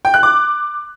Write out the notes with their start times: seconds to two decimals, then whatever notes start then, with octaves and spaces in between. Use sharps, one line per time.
0.05 G5
0.14 F#6
0.23 D6